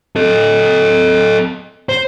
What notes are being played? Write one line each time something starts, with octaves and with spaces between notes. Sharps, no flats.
A4 D#5
C5